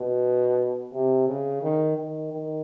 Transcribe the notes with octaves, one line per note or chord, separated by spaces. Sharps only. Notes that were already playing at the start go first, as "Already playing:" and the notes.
Already playing: B2
C3
C#3
D#3
D#3
D#3